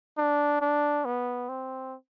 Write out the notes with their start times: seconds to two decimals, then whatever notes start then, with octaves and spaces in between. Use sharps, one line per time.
0.18 D4
0.62 D4
1.05 B3
1.49 C4